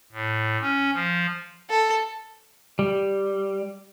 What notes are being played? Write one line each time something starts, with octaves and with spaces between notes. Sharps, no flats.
A2
C#4
F3
A4
G3